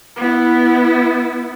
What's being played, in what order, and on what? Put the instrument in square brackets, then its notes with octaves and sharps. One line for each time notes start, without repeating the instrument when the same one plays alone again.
[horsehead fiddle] B3 E4